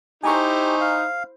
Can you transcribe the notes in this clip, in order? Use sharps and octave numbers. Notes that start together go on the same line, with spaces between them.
D#4 E4 G4 C5 G#5 A#5 C#6
F5